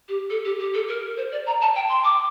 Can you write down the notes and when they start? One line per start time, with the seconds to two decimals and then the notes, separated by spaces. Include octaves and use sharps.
0.08 G4
0.30 A4
0.45 G4
0.59 G4
0.74 A4
0.88 A#4
1.17 C5
1.32 D5
1.46 A#5
1.61 A5
1.75 G5
1.89 C6
2.04 D6